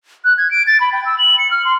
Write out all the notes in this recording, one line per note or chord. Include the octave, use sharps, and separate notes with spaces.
F#6
G#6
D7
A6
B5
G5
E6
F#7
C#7
F6
C6